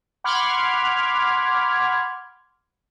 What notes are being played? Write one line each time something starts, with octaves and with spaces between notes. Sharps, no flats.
F#5 B5 C6 D6 F6 G#6